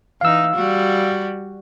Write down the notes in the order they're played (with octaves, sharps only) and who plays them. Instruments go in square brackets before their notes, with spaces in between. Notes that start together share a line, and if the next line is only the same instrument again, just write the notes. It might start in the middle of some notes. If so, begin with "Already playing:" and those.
[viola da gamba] E3 D#4 [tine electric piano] F5 E6
[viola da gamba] G3 F#4